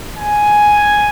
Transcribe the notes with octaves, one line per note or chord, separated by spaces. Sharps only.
G#5